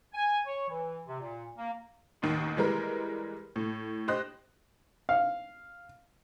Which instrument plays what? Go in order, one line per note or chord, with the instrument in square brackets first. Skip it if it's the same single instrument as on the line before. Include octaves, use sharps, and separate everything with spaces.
[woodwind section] G#5
C#5
E3
C3
A#2
A#3
[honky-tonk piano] A1 D#2 D#3
E3 G3 G#3 A#4 B4
A2
G4 C5 D#5 F#6
[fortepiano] F5